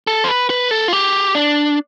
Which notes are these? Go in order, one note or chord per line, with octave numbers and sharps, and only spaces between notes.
A4
C5
B4
B4
A4
F4
G4
D4